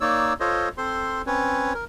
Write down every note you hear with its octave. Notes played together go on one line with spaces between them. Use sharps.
A#3 D#4 C#5 D5 E6
F4 A4 C5 C#5 D#5
C4 A4 C5 C6
C4 C#4 B4 C#5
A#4